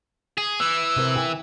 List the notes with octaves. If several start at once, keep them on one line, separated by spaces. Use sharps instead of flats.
G#4
E3 E6
C3 A#4
E4 G5 G#5